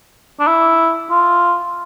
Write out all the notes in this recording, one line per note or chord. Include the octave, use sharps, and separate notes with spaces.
D4
E4
F4